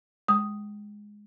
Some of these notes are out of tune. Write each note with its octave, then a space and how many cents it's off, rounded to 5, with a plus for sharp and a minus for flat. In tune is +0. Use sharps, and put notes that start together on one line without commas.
G#3 +0 D#6 +0